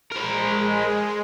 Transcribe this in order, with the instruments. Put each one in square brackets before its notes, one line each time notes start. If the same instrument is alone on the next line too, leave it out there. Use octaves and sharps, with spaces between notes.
[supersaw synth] G#3 [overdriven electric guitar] A#4 C5